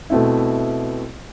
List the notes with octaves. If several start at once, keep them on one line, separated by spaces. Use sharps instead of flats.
B2 A3 C4 E4